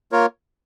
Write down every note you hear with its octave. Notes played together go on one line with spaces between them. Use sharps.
A#3 F4 A#4 C#5